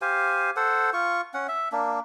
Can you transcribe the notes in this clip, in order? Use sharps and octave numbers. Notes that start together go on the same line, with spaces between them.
G4 C5 F5 G#5
A4 C5 F#5
F4 C#6
C#4 F#5
E5
A#3 D4